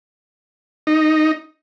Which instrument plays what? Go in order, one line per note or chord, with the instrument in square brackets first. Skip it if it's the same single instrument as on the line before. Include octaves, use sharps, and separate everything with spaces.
[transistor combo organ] D#4